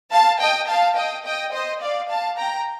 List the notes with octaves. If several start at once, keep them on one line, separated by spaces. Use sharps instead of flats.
F5 A5
D#5 G5
F5 A5
D#5 G5
D#5 G5
C5 D#5
D5 F5
F5 A5
G5 A#5